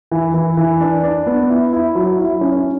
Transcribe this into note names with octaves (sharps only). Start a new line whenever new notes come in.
E3
E3
E3
D4
D4
B3
E4
E4
F#3
E4
C#4